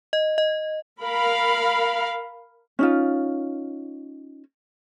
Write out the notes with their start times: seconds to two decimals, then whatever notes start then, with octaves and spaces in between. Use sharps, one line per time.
0.13 D#5
0.38 D#5
1.02 A#4 F5 B5
2.79 C#4 D#4 F4